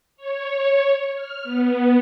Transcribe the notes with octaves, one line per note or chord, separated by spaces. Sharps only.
C#5
F6
B3